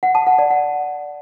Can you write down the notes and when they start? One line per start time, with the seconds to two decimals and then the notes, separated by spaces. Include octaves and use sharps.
0.03 F#5
0.15 A5
0.27 F#5
0.39 D5
0.50 F#5